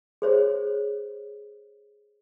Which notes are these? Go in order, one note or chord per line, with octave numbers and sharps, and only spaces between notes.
G#4 C5 C#5